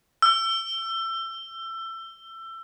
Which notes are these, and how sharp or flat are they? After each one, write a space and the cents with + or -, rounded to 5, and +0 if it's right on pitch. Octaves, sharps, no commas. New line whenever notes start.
E6 +25